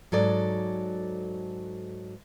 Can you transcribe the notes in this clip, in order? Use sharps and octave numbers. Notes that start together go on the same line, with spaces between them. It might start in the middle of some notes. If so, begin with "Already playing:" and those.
G#2 F#3 A4 D5